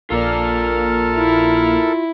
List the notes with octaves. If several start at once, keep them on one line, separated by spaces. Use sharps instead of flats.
A#1 A#3 F4 A4 A#4 D5 A5 F6
E4